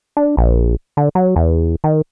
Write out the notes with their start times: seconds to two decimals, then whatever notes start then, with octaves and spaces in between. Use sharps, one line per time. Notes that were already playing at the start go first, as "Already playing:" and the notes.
0.17 D4
0.37 A#1
0.97 D3
1.15 F#3
1.36 E2
1.84 D#3